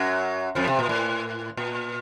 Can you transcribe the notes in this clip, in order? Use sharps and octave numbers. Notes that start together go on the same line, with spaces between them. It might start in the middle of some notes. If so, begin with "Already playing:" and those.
Already playing: F#2 F#3
F2 F3
C3
A#2
A2
A#2